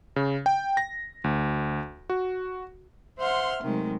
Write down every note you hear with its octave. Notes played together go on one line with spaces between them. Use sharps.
C#3
G5
A#6
D2
F#4
C5 E5 F#5 C6 F6
C3 D#3 F#3 G#3 A3